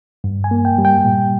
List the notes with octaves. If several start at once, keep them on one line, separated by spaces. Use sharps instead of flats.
G2
G#5
A#3
G5
G3
G5
A#2